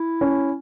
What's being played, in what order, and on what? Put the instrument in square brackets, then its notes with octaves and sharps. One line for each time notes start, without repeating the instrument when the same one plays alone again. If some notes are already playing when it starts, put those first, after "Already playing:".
Already playing: [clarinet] E4
[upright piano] C#4